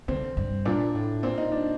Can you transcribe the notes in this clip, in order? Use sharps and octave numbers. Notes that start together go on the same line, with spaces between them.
D3 C4
G2
A#2 D4
A2
A#2 C4
D#4
D4